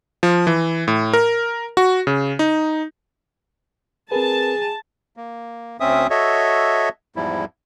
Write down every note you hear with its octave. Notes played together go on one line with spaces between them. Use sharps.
F3
E3
A2
A#4
F#4
C#3
D#4
C4 G#4 A#4 B4 A5
A#3
D2 C4 C#4 E5 D#6
F#4 A4 C#5 D#5 E5
E2 G#2 F3 G3 E4